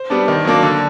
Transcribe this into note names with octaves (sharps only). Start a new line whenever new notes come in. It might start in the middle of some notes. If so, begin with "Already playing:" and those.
Already playing: C5
G3 B3 D4
D#3
F#3 A#3 D4
D3